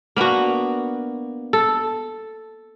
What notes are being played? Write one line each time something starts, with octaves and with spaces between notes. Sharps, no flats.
A#3 B3 D4 F#4
A4